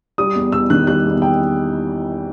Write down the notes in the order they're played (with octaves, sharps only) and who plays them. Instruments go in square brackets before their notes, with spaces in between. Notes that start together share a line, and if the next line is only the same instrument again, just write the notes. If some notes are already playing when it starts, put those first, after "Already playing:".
[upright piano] G3 D#6
E2
E2 E6
D#3 F#6
G3 F#6
E2
G5